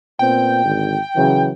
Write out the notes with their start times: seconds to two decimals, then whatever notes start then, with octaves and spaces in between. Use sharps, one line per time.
0.19 A#2 B3 C4 G5
0.64 G#1 D3
1.16 C#3 E3 F#3